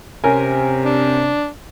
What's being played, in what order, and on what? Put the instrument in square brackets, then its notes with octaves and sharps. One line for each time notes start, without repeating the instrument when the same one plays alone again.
[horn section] C3 [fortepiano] C#4 A#4 G#5
[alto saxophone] D4